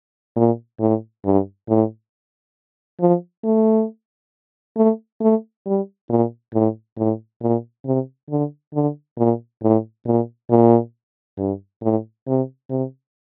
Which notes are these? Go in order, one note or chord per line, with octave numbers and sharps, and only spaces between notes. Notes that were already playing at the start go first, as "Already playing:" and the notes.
A#2
A2
G2
A2
F3
A3
A3
A3
G3
A#2
A2
A2
A#2
C3
D3
D3
A#2
A2
A#2
A#2
G2
A2
C3
C3